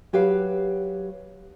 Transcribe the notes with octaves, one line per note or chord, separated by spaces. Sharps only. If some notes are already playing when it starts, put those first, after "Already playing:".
F#3 G4 B4 F5